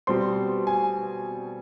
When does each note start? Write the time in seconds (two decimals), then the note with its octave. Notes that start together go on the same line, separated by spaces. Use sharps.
0.07 B2 G3 C4 C6
0.67 G#5